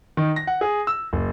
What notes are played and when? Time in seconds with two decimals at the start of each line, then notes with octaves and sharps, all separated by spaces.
0.17 D#3
0.36 A#6
0.47 F#5
0.61 G#4
0.87 E6
1.13 F#1